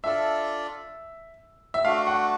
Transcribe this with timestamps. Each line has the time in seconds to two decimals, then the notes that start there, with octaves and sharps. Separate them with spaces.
0.04 D4 F4 A4 D5 E5
1.74 E5
1.84 A3 D4 F#4 F5
2.07 F#5